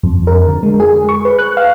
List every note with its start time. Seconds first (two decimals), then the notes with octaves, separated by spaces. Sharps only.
0.03 F2
0.27 A#4
0.47 D3
0.63 G#3
0.80 G#4
1.09 C#6
1.25 B4
1.39 F#6
1.57 F5